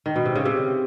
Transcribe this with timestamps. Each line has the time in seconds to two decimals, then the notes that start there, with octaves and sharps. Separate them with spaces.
0.06 D#3
0.16 B2
0.26 C3
0.35 C#3
0.45 C3